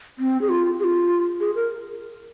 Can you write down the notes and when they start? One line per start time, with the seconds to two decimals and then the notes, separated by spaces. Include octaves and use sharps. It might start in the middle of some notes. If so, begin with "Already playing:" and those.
0.19 C4
0.41 G#4
0.49 F4
0.80 G#4
0.84 F4
1.40 G#4
1.55 A#4